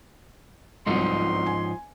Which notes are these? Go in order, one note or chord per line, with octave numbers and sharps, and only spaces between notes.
G1 C2 G#2 F3 F#3 D#4 C6
G#5